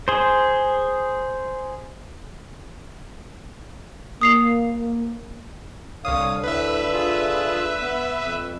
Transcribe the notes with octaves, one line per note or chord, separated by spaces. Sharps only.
G#4 C5
A#3 D#6 C7 F7
C2 D3 C#5 F5 D#6
D2 A2 B4 E5
F4 G#4
B3
F2